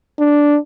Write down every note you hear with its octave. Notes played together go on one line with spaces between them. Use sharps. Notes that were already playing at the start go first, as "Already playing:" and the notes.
D4